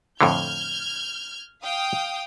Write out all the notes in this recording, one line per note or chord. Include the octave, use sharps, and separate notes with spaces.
F2 A2 D3 F6 G6 G#6
F5 G5 D#6